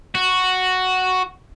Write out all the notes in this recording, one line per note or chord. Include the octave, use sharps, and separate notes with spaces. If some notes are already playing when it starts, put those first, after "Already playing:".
F#4